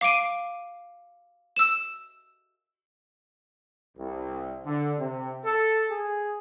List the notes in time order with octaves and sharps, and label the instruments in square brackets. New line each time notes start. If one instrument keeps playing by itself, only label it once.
[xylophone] F5 D6 C7 D7 D#7
E6 E7
[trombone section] C2
D3
C3
A4
G#4